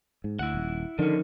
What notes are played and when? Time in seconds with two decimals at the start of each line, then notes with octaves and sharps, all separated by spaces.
0.24 G#2
0.39 D2 E4 F#5
0.54 D#1
0.99 D3 D#3 F3 C#4